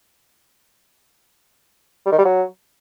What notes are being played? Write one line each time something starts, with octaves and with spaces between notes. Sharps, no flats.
G3
D#3
G3
F#3